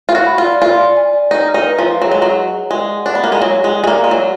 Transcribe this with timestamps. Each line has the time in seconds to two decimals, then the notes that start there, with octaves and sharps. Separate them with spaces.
0.09 F4 F5
0.15 F#4
0.26 B5
0.38 F4
0.44 D5
0.62 F4 G#5
0.79 D5
0.97 G#5
1.13 D5
1.31 D#4 A#5
1.48 F6
1.54 D#4
1.66 B4
1.79 F3
1.84 A#5
2.01 F#3 G#4
2.11 G#3
2.18 F#3 D#5
2.36 G#4
2.53 G#4
2.71 G#3 D5
2.89 F#5
3.06 D4 F#5
3.15 B3
3.24 A#3 B5
3.32 G#3
3.42 F#3 F5
3.59 D5
3.64 G#3
3.76 D5
3.84 G#3
3.87 A#3
3.94 D5
4.04 G#3
4.11 F#3 G#5